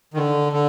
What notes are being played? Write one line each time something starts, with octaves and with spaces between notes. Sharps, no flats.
D#3
D3
D3